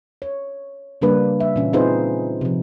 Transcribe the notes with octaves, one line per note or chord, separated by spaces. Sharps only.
C#5
C#3 G3 A#3 D4 B4
E5
A#2 E3 C#4
C4 D#4 F4 G#4 B4 C5
C3 F3